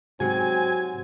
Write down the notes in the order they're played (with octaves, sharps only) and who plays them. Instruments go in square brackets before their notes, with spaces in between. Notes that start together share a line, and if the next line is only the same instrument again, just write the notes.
[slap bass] G#2 C3 [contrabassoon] F#3 [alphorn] C4 [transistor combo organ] G#5